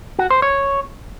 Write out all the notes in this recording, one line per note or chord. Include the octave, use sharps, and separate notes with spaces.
F#4
C5
C#5